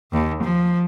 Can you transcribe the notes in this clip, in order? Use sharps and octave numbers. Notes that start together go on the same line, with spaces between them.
D#2
F3